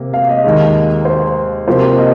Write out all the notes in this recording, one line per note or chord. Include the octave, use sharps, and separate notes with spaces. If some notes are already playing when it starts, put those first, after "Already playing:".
Already playing: C3 A#3
F5
D#5
D#2 D#3 G#3
C5
C3 F3 A#3 C5
D#5